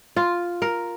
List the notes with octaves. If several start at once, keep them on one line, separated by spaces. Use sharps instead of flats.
F4
A#4